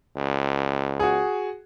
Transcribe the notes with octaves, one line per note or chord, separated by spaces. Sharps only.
C#2
F#4 G#4